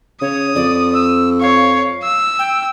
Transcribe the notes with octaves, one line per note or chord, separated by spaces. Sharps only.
C#3 C#5 D#6
F2 D5
E6
C#5 F5
E6
G5